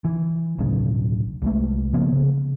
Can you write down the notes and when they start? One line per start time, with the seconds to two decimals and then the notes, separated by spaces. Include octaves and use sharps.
0.05 E3
0.58 D1 B1 A2 C#3
1.42 C2 G#3 A3
1.93 C#3 F3 A#3 B3
2.12 C#3